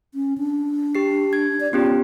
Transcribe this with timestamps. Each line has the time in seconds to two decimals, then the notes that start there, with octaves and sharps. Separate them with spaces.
0.14 C#4
0.38 D4
0.95 G4 C7
1.33 G#6
1.60 D5
1.73 B3 C#4 F4 G4